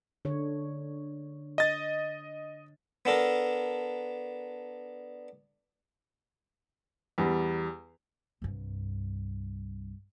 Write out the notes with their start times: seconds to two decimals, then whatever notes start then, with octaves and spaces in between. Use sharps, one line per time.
0.25 D3 C#5
1.58 D#5 A6
3.05 B3 D4 A4 A#4
7.18 E2 G3
8.42 C2 G2